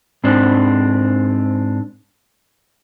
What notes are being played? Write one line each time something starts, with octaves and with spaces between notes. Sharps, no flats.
G#2 C4 D4